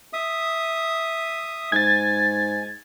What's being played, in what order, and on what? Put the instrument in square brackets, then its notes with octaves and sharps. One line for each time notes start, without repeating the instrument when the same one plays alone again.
[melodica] E5 D#6
[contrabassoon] G#2 [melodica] G#5 [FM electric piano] G#6 A6